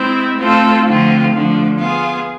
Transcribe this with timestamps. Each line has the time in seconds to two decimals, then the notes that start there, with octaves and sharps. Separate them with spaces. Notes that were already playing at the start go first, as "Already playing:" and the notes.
Already playing: G#3 C4 E4
0.37 A3 C4 F4 A4
0.85 D3 F3 A3 C4 F4
1.31 D3 F3 A3 D4
1.78 B3 F4 G#4